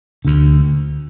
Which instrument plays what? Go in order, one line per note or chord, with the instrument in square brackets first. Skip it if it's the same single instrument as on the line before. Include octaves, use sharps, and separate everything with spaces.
[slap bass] D2 D3